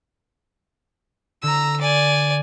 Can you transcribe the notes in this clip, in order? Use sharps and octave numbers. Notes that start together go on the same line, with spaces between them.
D3 A#5 E6
D5 G#5